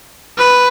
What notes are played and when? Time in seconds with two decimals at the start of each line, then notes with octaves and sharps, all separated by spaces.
0.38 B4